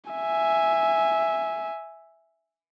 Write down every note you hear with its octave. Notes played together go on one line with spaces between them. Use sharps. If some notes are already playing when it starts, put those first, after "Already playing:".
E5 G#5